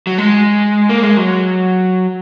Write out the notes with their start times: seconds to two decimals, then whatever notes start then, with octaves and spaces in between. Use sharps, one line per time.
0.07 F#3
0.18 G#3
0.89 A#3
1.03 G#3
1.17 F#3